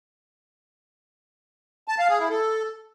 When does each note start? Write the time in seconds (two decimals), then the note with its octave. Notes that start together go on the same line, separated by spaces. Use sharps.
1.88 A5
1.99 F5
2.09 G#4
2.19 E4
2.30 A4